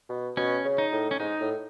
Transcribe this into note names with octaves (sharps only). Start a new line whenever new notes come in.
B2
B2 C#4
C#3
D#4
A2
C#4
G#2 D#4
A2